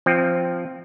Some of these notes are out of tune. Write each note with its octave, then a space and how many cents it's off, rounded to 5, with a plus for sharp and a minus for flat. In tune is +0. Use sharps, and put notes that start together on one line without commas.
F3 -5 C4 +0